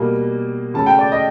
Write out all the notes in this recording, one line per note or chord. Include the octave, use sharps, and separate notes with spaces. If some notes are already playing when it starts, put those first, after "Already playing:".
Already playing: B2 G3 A#3
C#3 F#3 A3 A5
G5
D5
D#5